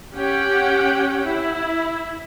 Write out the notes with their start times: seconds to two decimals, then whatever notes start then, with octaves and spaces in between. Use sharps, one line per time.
0.15 C#4 G4 F#5 G5
1.25 E4